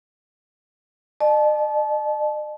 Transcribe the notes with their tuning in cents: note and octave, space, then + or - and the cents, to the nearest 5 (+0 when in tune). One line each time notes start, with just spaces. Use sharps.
D#5 -45 A5 -30